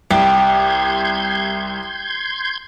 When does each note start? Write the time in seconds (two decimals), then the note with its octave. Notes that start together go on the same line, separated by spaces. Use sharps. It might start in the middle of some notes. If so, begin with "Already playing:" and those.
0.11 C2 G4 C6 G6 G#6